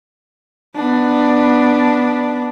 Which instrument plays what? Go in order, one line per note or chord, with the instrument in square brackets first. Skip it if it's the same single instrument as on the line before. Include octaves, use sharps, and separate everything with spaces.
[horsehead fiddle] B3 D4